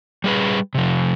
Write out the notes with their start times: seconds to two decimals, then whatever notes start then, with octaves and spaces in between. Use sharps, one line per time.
0.24 G3 G#4 B4
0.75 C3 F3